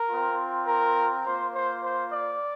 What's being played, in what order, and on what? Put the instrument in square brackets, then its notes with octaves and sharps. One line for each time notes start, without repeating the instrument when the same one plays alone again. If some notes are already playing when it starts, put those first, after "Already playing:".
Already playing: [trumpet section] A#4
C4 F4
A#4
A#3 F4 C5
C5
C5
D5